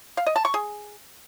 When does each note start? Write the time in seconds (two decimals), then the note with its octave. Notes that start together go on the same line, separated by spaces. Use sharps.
0.17 F5
0.26 D#5
0.36 A5
0.45 C#6
0.54 G#4